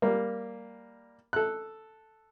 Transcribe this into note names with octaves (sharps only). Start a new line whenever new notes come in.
G3 A#3
A4 F#6